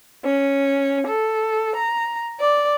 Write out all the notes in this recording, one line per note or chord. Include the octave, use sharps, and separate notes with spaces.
C#4
A4
A#5
D5